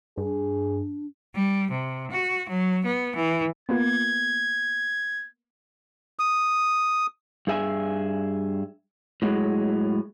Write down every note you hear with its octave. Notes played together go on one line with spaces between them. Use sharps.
G2 D4 G#4
G3
C3
F#4
F#3
B3
E3
A#3 B3 F4 G#6
D#6
G2 G#4 E5 G#5
A2 F#3 G#3 G#4